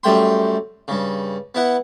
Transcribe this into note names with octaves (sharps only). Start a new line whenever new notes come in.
F#2 G3 A3 G5 C6
G2 C#3
B3 E4 F#5